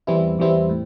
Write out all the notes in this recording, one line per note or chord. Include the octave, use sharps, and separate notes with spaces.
E2 E3 G3 C4 E4
E2 E3 G3 C4 E4
A2